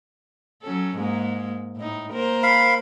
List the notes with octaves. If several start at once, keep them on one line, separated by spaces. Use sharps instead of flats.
F#3 C#4 A4
G#2 G#3 A#3
A2 D#4
A#3 A#4 C5
F5 B5